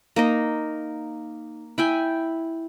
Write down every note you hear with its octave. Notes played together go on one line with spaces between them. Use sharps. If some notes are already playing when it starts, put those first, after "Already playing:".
A#3 D#4 D#5
E4 G5 G#5